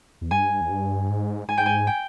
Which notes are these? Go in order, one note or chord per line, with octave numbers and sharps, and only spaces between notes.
E2
G2 G#5
E2
G2
G#2
G#2 G#5
G5
G#5
G5